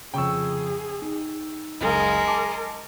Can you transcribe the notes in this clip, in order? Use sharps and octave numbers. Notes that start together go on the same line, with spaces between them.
F2 C#3 G#4 G5 C#6 E6
D#4
F#1 C#2 G#3 A#4
A5 D6